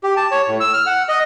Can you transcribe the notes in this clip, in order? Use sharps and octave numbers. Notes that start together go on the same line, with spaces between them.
G4
A5
C#5
A2
E6
F6
F#5
D#5